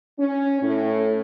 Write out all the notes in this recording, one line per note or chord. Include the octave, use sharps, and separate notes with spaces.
C#4
A2